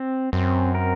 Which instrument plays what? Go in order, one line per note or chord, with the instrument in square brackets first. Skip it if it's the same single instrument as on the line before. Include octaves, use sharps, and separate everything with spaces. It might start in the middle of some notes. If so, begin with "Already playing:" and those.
Already playing: [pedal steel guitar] C4
[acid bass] F#2 [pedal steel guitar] C4
[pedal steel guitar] A#4